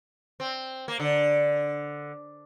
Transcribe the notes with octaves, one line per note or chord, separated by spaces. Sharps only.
C4
A#3
D3